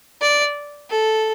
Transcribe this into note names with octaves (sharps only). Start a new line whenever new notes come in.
D5
A4